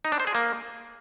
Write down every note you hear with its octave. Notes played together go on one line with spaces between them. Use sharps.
D#4
D4
C5
G#4
A#3